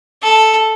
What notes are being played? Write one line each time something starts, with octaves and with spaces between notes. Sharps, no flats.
A4